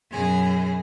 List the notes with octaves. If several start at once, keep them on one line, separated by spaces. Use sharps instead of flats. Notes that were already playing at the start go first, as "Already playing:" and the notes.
F#2 B2 G#4